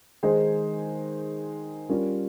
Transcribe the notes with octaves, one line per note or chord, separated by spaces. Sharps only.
D#3 G#3 D#4 G#4 C5
G3 C#4 F4 A#4